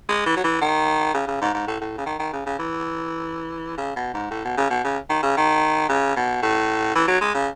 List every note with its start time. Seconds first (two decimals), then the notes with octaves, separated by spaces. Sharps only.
0.08 G#3
0.26 E3
0.37 F#3
0.44 E3
0.61 D#3
1.14 C#3
1.27 C#3
1.41 G#2
1.54 G#2
1.67 A2
1.81 A2
1.98 C#3
2.06 D#3
2.19 D#3
2.33 C#3
2.46 C#3
2.59 E3
3.78 C#3
3.96 B2
4.14 G#2
4.31 A2
4.45 B2
4.57 C#3
4.70 B2
4.84 C#3
5.09 D#3
5.23 C#3
5.37 D#3
5.89 C#3
6.16 B2
6.42 A2
6.95 E3
7.08 F#3
7.21 G#3
7.34 C#3